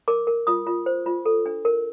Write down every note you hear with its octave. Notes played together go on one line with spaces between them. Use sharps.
A#4 D6
A#4
F4 D#6
F4
C5
F4
A4
D4
A#4